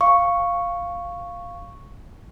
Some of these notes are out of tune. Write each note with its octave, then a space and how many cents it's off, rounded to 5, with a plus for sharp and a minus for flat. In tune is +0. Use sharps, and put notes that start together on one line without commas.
F5 +0 C#6 +0